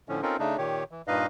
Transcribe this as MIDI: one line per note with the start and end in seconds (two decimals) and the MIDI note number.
0.09 0.22 45
0.09 0.22 50
0.09 0.22 53
0.09 0.22 61
0.22 0.37 60
0.22 0.37 61
0.22 0.37 63
0.22 0.37 65
0.22 0.37 69
0.22 0.37 70
0.39 0.57 49
0.39 0.57 57
0.39 0.57 62
0.39 0.57 63
0.58 0.84 46
0.58 0.84 51
0.58 0.84 67
0.58 0.84 73
0.91 1.02 52
1.08 1.26 43
1.08 1.26 46
1.08 1.26 63
1.08 1.26 71
1.08 1.26 75
1.08 1.26 77